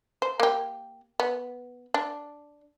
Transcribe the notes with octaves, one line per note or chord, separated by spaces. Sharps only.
C5
A#3 G4
B3
D4